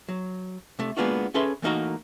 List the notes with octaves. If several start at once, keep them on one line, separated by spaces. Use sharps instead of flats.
F#3
C3 A3
G#3 A#3 B3 D4 F4 F#4
C#4 G#4 A4 B4 E5 C6
E3 A3 A#3 D#4 F#4 A#4